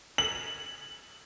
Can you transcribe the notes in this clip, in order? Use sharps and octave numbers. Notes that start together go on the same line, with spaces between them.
F#7